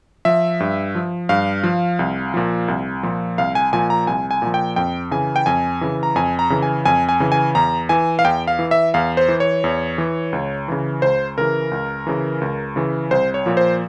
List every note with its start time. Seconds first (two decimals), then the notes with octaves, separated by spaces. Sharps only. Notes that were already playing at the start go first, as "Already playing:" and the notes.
0.25 F3 E5
0.60 G2
0.95 F3
1.29 G2 F5
1.63 F3
1.99 C2
2.34 A#2 F3
2.68 C2
3.03 A#2 F3
3.38 C2 F5
3.55 G#5
3.73 A#2 F3 G#5
3.90 A#5
4.07 C2 G#5
4.31 G#5
4.42 A#2 F3
4.54 G5
4.76 F2 G5
5.11 C#3 E3 G#5
5.36 G5
5.46 F2 G#5
5.81 C#3 E3
6.03 A#5
6.16 F2 G#5
6.39 A#5
6.50 C#3 E3
6.62 G#5
6.85 F2 G#5
7.09 G#5
7.20 C#3 E3
7.32 G#5
7.55 E2 A#5
7.89 E3 G#5
8.19 F5
8.24 E2 G5
8.47 F5
8.59 E3
8.71 E5
8.94 E2 F5
9.17 C5
9.28 E3
9.40 C#5
9.64 E2
9.98 E3
10.33 C#2
10.68 C#3 E3
11.02 C#2 C5
11.38 C#3 E3 A#4
11.71 C#2
12.07 C#3 E3
12.41 C#2
12.76 C#3 E3
13.11 C2 C5
13.34 C#5
13.46 A#2 F3
13.57 C5